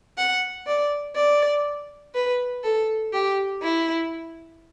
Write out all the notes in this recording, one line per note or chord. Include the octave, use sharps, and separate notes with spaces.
F#5
D5
D5
B4
A4
G4
E4